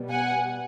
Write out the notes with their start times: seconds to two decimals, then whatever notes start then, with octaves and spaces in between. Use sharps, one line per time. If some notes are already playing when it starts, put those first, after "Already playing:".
Already playing: B2 G3 B3
0.09 F#5 G#5